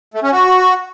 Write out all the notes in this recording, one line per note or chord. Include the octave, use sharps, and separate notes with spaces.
A3
C#4
F#4